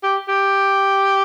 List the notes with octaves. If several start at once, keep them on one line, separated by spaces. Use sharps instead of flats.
G4
G4